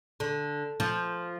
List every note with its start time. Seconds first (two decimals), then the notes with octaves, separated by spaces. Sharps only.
0.20 D3
0.80 F3